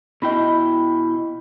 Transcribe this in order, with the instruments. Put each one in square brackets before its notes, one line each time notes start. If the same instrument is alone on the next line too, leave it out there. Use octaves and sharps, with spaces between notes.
[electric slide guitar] B2 E4 G5 [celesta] D#5 B5